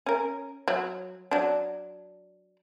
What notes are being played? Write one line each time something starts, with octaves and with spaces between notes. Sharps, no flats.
C#4 A#4
F#3
F#3 D4